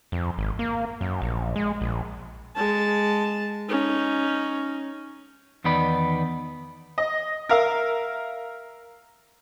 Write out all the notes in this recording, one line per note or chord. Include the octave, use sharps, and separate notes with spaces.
F2
G#1
A#3
F#2
A#1
G#3
A#1
G#3 A5
C#4 D#4
E2 D#3 B3 D#4 D5 B5
D#5
A#4 E5 F5